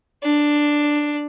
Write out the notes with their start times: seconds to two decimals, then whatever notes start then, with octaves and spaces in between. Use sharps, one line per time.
0.23 D4